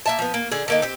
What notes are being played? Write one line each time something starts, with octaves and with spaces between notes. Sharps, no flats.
A#3 E5 A5
F3 B3
A#3
D3 G#4
D3 A#3 D#4
C4 G4